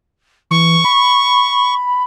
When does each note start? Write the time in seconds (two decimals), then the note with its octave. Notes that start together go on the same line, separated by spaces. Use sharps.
0.51 E3 C#6
0.85 B5